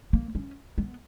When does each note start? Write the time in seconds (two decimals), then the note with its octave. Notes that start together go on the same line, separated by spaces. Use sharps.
0.13 A#3
0.35 C#4
0.78 B3